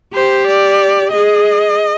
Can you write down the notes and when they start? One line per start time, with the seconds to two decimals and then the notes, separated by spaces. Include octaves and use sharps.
0.14 G4 C5
0.46 D5
1.11 G#4 D#5